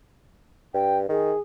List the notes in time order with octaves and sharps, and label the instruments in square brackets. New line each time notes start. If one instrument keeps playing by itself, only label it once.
[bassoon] G2 [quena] G5
[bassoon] D#3 [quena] G#4